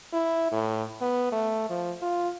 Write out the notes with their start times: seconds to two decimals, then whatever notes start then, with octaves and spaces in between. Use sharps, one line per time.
0.13 E4
0.52 A2
1.01 B3
1.32 A3
1.70 F3
2.02 F4